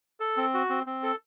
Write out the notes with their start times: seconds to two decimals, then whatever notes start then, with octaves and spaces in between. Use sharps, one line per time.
0.20 A4
0.37 C4
0.54 F#4
0.70 C4
0.86 C4
1.03 A4